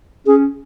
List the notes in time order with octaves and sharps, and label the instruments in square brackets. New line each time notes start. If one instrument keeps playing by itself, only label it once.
[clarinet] C#4 [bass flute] G#4